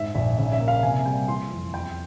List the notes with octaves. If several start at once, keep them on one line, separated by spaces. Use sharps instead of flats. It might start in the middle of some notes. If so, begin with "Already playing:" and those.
Already playing: G#2 E5
A#1 E5
C#3 E5
E5
A#3
F5
C3 G#5
G3 G5
E3 C6
F2
E2 G5